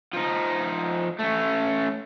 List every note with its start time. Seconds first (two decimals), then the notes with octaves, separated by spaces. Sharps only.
0.14 F3 D#4
1.19 A3 C#4